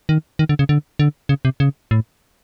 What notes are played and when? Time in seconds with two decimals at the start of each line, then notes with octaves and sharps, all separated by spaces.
0.09 D#3
0.39 D#3
0.49 D3
0.59 C#3
0.69 D3
0.99 D3
1.29 C#3
1.45 C3
1.60 C#3
1.91 A2